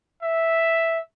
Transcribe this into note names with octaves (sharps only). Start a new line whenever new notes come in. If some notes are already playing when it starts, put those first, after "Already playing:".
E5